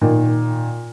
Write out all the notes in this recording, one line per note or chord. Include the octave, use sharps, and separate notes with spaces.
A#2 D#3